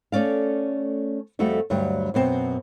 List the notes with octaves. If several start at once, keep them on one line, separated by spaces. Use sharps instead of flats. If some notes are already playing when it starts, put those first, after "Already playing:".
A3 C#4 D5 F5
F2 G3 A3 F#4
D2 G2 F#3 G3
F#2 B2 C4